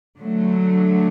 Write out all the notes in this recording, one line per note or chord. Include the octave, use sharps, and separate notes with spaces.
D3 F#3 A3